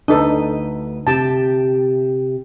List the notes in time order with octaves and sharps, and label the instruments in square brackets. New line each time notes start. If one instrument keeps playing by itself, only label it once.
[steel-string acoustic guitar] D2 B4 D#5 [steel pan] D4 D#4 A4
[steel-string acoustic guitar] C3 G4 [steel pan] A5